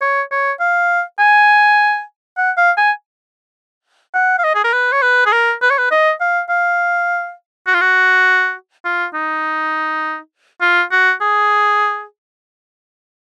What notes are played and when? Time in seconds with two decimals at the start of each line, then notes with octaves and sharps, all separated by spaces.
0.01 C#5
0.31 C#5
0.60 F5
1.19 G#5
2.37 F#5
2.57 F5
2.77 G#5
4.14 F#5
4.38 F5
4.44 D#5
4.55 G#4
4.64 A#4
4.73 B4
4.92 C#5
5.02 B4
5.26 G#4
5.32 A#4
5.62 B4
5.70 C#5
5.78 B4
5.91 D#5
6.20 F5
6.49 F5
7.67 F#4
7.74 F4
7.81 F#4
8.85 F4
9.14 D#4
10.61 F4
10.92 F#4
11.21 G#4